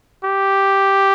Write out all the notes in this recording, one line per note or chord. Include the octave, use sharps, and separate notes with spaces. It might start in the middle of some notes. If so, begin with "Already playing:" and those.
G4